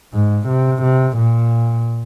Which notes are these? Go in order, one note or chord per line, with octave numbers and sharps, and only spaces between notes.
G#2
C3
C3
A#2